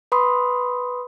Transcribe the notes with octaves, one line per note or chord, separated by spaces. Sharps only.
B4 B5 C6 D#6